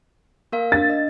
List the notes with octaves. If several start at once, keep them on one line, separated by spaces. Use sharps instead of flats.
A#3 A#4 F5
D4 A6
D#5